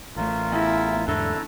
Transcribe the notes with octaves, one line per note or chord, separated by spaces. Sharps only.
A1 A3 F4 A#4
E2 E4
E2 G#2 D3 A3 E4 A5 A#5